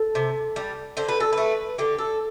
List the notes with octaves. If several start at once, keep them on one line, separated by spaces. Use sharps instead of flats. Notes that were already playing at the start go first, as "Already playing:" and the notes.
Already playing: A4
C3
G3
D3 C5
B4
A4
A3 B4
D3 G4
A4